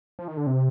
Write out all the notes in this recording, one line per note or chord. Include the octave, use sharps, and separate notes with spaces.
F3
D#3
D3
C3